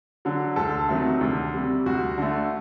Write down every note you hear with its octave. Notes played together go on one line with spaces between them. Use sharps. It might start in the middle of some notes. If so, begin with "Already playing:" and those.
D3 F#3
D2 A4
C3 D#3 F#3 A3
D2
C3 G3
D2 F#4
D3 A3